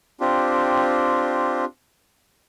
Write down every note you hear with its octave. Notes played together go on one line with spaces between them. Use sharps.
C4 D4 F4 G4